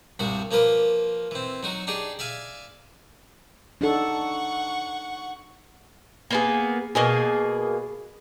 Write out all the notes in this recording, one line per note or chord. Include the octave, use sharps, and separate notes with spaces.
C2 G2 G3 F#4
F3 A#3 F4 A#4 B4 D6
E3 C4
F#3 D#4 F#4
D4 D#4 G4 G#4 D5
D5 E5 F5 G#5
D4 D#4 A4 F#5 C#6
A#3 B3 G#4
B2 A#3 G#4